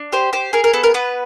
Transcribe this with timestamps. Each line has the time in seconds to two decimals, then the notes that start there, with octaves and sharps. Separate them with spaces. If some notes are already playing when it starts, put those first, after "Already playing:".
Already playing: D4
0.12 G4 C5
0.33 G4 C5
0.53 G#4 A#4
0.64 A#4
0.73 B3 A4
0.84 A#4
0.94 B3 B4